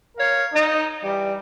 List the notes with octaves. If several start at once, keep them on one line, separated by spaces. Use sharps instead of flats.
A#4 C#5 F5
D#4
E3 G3